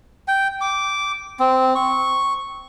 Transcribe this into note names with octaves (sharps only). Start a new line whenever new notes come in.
G5
D6
C4
C#6